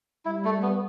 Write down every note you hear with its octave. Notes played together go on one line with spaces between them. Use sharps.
G3 E4
A3
G3
B3